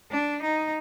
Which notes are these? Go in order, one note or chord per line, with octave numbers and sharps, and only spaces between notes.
D4
D#4